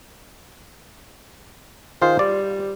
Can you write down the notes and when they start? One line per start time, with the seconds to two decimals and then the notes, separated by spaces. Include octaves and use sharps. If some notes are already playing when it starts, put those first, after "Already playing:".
2.02 D#3 F4 G#4 C5
2.19 G3 D5